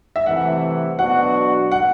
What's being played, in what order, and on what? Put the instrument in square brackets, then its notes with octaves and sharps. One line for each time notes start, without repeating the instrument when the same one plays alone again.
[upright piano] E5
[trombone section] C2 C3 E3 A3 [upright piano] F#5
[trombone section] B2 F#3 B3 D4 F#4 [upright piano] F#5
[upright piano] F#5